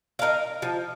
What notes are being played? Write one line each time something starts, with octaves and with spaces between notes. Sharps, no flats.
D#4 A#4 F5
F3